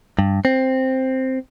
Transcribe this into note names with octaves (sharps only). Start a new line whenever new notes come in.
G2
C4